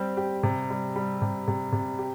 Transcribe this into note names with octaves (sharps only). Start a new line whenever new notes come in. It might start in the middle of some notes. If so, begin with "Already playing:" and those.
Already playing: G3 C4 G4
G4
C3
G3
G3
C3
C3
C3
G4